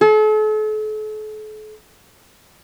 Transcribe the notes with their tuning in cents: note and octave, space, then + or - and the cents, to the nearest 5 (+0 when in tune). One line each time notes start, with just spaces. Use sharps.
A4 -40